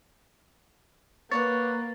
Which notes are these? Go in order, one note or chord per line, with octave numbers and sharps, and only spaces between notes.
A#3 B4 C#5 D5 F#5 A6